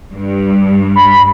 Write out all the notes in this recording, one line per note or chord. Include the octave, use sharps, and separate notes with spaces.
G2
B5